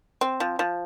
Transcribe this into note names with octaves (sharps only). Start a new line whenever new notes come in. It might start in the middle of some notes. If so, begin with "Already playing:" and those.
C4
F3
F3